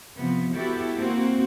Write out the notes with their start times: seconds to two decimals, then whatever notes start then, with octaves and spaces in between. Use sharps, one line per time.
0.16 C3 F3 B3
0.55 B3 E4 F#4 G4 A4
0.97 A#3 C4 F#4